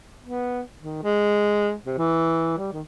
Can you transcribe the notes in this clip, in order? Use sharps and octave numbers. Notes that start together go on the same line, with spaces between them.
B3
D#3
G#3
C3
E3
G3
D#3